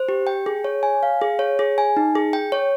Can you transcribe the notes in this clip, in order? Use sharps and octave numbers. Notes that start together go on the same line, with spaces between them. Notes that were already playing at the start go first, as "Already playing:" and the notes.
Already playing: C5
G4
G5
G#4
C#5
G#5
F5
G#4
C#5
G#4
G#5
D#4
G#4
G5
C#5